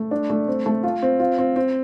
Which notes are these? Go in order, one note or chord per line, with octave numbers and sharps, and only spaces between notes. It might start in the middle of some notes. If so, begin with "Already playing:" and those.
Already playing: A3
D4
A3
C4
A3
F4
C4
F4
C4
C4